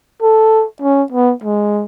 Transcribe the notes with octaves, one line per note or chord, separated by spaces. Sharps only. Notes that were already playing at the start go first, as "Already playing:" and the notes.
A4
C#4
B3
G#3